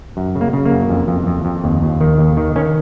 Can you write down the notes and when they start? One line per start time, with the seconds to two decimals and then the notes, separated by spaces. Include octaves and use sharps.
0.17 F#2
0.35 C#3
0.41 A#3
0.53 C#3
0.65 A#3
0.71 F#2
0.89 F2
1.08 F2
1.27 F2
1.45 F2
1.64 D#2
1.83 D#2
2.01 D#3
2.18 D#2
2.37 D#3
2.56 D#3 C#4